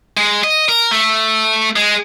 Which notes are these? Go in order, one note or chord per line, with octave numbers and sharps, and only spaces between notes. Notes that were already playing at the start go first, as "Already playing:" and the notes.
G#3
D#5
A#4
A3
G#3